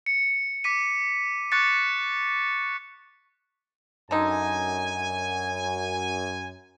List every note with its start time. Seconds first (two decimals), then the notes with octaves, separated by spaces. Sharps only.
0.06 C#7
0.64 D6 B6 D#7
1.51 C#6 D6 F#6 A6 C#7
4.11 F#2 D3 D#4 G#5